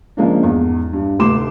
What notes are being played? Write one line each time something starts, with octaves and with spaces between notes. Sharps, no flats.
C#3 F3 G#3 A#3 D4
E2 G#2
G2
F1 D2 C6 D6 E7